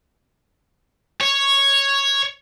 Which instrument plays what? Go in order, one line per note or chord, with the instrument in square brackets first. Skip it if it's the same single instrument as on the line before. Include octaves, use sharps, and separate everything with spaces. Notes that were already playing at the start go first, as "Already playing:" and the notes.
[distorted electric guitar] C#5